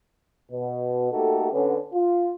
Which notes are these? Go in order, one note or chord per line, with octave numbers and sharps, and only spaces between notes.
B2
A3 A#3 D#4 F#4 G4 A4
D3 B3 C#4
F4